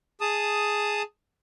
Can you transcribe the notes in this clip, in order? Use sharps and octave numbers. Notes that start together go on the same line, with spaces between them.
G#4 A5 D#6